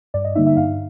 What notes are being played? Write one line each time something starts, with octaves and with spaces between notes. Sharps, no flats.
G2 D5
D#5
D3 G3 A#3 D#4 E5
E5
G2 F5